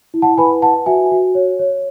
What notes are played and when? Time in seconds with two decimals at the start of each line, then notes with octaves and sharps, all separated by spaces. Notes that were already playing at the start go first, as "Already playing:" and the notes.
0.14 E4
0.22 F#5 A5
0.38 B4 G#5 B5
0.62 B4 F#5 A5
0.86 F#4 E5 G#5
1.11 F#4
1.35 C#5
1.59 C#5